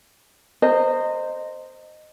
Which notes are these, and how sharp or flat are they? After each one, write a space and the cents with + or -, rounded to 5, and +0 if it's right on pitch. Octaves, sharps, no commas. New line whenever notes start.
C5 +0 D#5 -15 A#5 -35